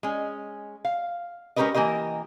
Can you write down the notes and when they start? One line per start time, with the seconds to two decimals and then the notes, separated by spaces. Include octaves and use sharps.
0.03 G#3 C#4
0.85 F5
1.56 G#3 C#4 G4 A#4 B4 D#5
1.74 E3 A#3 G4 A#4 D#5